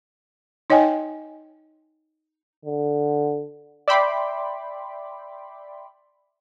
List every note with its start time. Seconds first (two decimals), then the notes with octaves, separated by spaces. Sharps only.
0.70 D#4 C#5 D#5 G5 G#5
2.65 D3
3.88 D5 E5 G5 B5 C6 D6